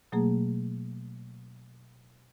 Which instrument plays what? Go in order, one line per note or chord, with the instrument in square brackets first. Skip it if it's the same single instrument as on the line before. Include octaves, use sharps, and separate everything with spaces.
[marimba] B2 F#3 A3 A#3 G#4